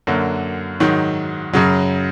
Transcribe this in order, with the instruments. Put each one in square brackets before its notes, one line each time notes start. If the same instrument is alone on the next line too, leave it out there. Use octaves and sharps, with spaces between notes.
[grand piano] F#2 D3 F#3 A#3
G#2 D#3 F#3
F#2 C#3 F#3